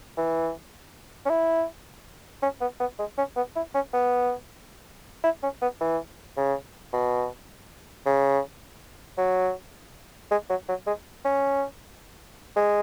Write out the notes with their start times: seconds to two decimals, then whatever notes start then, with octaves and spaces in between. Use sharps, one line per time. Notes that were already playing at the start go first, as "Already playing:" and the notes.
0.17 E3
1.25 C#4
1.30 E4
2.42 C#4
2.61 B3
2.80 B3
2.99 G#3
3.17 C#4
3.36 B3
3.56 E4
3.74 C#4
3.93 B3
5.24 E4
5.43 C#4
5.62 B3
5.80 E3
6.37 C#3
6.93 B2
8.06 C#3
9.18 F#3
10.31 G#3
10.49 F#3
10.68 F#3
10.87 G#3
11.24 C#4
12.56 G#3